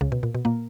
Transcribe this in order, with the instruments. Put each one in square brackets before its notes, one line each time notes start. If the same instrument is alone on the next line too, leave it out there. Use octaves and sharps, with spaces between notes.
[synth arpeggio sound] C#2 C#3
B2
A#2
B2
A#2 A#3